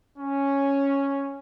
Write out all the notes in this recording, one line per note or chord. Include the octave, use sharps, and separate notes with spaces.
C#4